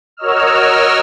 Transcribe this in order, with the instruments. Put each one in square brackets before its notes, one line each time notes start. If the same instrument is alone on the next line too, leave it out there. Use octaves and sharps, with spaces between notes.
[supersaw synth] F#4 A#4 C#5 D#5 E6 F6